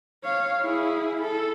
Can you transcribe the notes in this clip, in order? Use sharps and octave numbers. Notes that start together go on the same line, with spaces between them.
C#5 F5
E4 G#4
A4